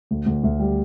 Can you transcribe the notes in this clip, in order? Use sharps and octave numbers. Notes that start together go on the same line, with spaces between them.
D2
D2
D2
G3